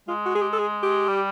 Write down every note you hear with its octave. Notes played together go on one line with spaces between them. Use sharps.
G#3 F4
F#4
G#4
G4
A4
G#4
G4
G3